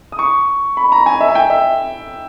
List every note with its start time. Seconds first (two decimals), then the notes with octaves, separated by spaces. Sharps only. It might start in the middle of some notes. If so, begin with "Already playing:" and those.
0.12 D#6
0.19 C#6
0.77 B5
0.92 A#5
1.06 G#5
1.21 E5
1.29 G#5
1.35 G5
1.50 E5